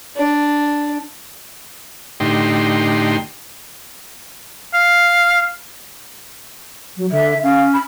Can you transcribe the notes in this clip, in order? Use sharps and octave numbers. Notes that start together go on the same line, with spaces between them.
D4
A2 D3 D#4 G4 C6
F5
F#3
D3 E5
C#4 F5
B5